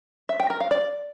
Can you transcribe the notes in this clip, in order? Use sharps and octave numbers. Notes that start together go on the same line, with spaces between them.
E5
G5
A#4
F5
D5